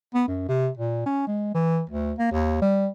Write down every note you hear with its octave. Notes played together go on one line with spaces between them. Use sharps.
B3
F#2
C3
A#2
C#4
G#3
E3
D2
A#3
D#2
G3